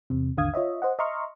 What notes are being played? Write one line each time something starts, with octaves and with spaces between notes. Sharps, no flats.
E2 C3
G#1 D#2 D3 F5 D#6 G#6
F4 C#5 D#5 E5
C5 D#5 F#5
D#5 E5 A#5 C6 C#6 F6